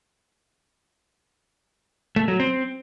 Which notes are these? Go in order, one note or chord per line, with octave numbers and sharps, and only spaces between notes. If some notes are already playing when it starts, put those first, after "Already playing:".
A3
F#3
C4